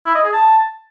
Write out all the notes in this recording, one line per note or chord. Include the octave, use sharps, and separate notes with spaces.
E4
D#5
G#4
A5